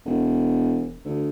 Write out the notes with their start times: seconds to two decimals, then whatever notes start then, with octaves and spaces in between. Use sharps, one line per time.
0.05 E1
1.05 D2